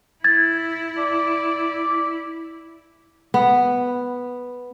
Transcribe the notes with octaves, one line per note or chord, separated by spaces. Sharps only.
E4 G#6 A6
D5
B3